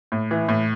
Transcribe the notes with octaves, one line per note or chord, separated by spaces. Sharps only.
A2
E3
A2